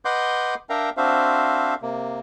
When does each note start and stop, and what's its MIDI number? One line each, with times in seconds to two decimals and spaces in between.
0.05 0.55 71
0.05 0.55 75
0.05 0.55 78
0.05 0.55 84
0.05 0.55 86
0.05 0.55 91
0.70 0.90 62
0.70 0.90 70
0.70 0.90 76
0.70 0.90 77
0.70 0.90 79
0.70 0.90 82
0.97 1.74 60
0.97 1.74 62
0.97 1.74 66
0.97 1.74 72
0.97 1.74 76
0.97 1.74 77
1.82 2.20 48
1.82 2.20 58